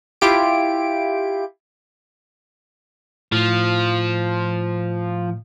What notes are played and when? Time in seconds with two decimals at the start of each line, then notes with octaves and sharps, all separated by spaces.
0.21 E4 F4 G4 D7
3.32 A2 F3